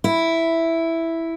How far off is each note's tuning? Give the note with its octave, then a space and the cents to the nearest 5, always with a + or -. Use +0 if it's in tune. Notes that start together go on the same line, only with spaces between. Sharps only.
E4 +0